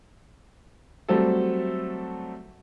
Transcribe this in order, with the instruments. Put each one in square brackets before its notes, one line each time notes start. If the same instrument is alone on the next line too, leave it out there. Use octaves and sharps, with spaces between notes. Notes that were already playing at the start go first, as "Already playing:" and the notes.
[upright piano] F#3 G3 A3 C4 F#4 A4